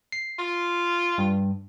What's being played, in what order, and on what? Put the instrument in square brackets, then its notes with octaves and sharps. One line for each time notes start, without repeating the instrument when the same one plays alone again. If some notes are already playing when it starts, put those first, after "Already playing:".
[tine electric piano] C7
[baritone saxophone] F4
[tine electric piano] G2